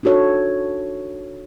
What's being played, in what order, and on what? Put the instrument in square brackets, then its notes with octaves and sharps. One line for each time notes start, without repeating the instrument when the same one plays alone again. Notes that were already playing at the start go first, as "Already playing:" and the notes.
[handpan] D4 D#4 F#4 A4 C#5